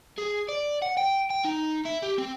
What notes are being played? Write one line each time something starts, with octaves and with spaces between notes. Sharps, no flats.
G#4
D5
F#5
G5
G5
D#4
E4
G4
C4